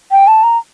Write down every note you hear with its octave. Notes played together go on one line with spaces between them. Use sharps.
G5
A5
A#5